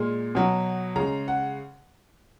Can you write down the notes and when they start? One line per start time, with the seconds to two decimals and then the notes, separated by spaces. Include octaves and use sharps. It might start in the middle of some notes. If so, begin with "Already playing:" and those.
Already playing: A#2 G#3
0.35 B2 F#3
0.96 C#3 G#3 A#5
1.28 F#5